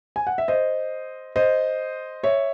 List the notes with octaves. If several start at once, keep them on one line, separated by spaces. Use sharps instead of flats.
G#5
F#5
E5
C5 D#5
C5 D#5
C#5 E5